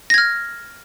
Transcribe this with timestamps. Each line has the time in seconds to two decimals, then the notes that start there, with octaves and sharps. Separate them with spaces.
0.10 A#6
0.14 G#6
0.18 F6